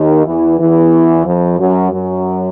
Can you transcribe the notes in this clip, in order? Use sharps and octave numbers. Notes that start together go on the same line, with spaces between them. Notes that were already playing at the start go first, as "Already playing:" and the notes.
Already playing: D#2 D#3
E2 E3
E2 E3
F2 F3
F#2 F#3
F#2 F#3